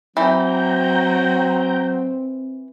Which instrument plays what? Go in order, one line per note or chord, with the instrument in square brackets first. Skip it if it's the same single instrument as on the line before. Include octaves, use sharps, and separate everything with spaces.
[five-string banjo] E3 [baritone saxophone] F#3 [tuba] C4 [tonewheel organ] G5 A#5 G6